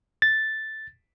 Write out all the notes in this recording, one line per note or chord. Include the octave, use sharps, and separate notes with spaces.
A6